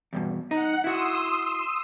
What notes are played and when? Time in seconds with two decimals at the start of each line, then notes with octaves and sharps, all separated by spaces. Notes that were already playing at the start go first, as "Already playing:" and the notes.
0.13 E2 G2 B2
0.51 D#4 F#5
0.84 E4 F#4 C6 D#6 E6